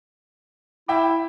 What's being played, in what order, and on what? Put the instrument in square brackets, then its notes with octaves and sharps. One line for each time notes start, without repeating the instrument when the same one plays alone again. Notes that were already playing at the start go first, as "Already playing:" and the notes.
[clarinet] E4 [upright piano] E5 G5 D6